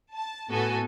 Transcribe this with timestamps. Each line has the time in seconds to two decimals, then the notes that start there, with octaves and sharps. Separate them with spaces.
0.15 A5
0.50 A2 B3 F#4 A4 G#5